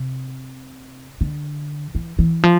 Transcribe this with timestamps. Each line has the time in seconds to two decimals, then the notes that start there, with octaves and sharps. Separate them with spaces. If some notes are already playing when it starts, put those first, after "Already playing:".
Already playing: C3
1.21 D3
1.95 E3
2.19 E3
2.43 F3